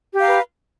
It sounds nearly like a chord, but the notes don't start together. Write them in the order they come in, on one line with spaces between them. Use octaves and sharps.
G4 F5 A#5 B4